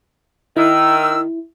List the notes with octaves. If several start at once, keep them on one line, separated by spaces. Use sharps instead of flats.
D#3 E4 E6